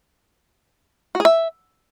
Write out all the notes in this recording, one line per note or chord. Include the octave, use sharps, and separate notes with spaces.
F#4
G#4
E5